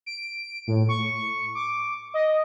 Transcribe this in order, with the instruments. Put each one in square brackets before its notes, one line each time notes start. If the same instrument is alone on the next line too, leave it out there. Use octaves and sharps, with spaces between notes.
[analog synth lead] D7
A2
C#6
D6
D#5